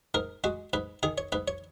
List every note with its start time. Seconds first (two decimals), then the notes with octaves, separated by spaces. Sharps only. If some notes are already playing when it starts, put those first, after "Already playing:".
0.14 G#2 A#4
0.44 G#3 F#4
0.73 G#2 B4
1.03 D#3 G#4
1.18 C#5
1.32 G#2 B4
1.48 C#5